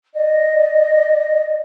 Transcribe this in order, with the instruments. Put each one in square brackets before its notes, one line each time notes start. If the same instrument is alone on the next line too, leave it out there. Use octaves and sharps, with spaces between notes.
[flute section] D5 D#5